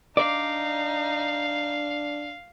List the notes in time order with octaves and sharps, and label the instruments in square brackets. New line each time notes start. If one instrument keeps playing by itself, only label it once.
[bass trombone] D4 [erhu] D#4 [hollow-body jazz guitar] D5 [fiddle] F5